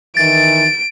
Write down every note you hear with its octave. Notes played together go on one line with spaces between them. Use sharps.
D#3 E3 A6 D7